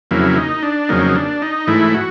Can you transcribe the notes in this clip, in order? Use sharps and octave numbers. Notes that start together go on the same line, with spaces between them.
F2 C#3 F#3 A#3 E4
D#4
D4
F2 C#3 F#3 A#3 D#4
D4
D#4
G#2 E3 A3 E4
F#4